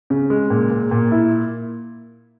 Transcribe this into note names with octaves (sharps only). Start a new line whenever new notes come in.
C#3
G#3
A#2
A#2
A#2
E4